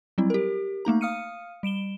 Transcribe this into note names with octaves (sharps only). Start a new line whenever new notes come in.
F#3 G3 C4 E4
G4 A#4
A3 A#3 D#4 A#5
F5 D#6 F6 C#7 D#7
G3 D7 E7 G7